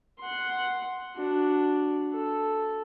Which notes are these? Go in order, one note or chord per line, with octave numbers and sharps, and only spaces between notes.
F#5 C6
D4 F#4
A4